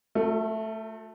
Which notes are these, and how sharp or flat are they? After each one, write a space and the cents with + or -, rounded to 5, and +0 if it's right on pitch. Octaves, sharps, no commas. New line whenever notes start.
A3 +0 F#4 -40 A4 +45